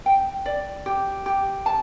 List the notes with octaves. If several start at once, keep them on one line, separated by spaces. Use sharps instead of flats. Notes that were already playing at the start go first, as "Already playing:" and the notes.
G5
D5
G4
G4
A5